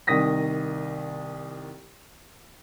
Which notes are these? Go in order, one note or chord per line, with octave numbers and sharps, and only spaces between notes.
C2 D#3 D#6 A#6 B6